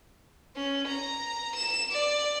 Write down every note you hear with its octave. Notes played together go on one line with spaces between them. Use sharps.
C#4
A#5
E7
D5